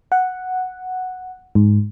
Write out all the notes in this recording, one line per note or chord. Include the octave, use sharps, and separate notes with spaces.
F#5
G#2